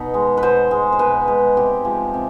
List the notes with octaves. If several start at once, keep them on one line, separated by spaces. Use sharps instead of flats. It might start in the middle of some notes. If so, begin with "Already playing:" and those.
Already playing: B2 D#4
G#3
B4
B2 C5
G#3
C5
B2 B4
G#3
C3 G4
F3 G#3
C3